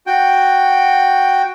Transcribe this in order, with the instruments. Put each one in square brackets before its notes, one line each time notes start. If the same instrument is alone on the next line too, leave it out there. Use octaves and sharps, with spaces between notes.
[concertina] F#4 G5